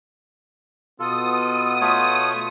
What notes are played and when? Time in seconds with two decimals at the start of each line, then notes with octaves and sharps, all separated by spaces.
1.00 B2 B3 F4 A4 D#6
1.81 A3 F4 C#5